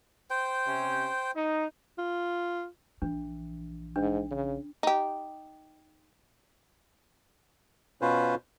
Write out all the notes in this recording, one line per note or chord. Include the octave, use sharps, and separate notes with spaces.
C5 G5
C3 C#4
D#4
F4
A#1 E3 D4
G#2 D4
C#3
D#4 G4
B2 C#4 F4 B4 C5